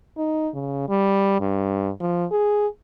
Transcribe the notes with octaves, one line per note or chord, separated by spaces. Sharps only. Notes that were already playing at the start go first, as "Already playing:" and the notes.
D#4
C#3
G3
G2
F3
G#4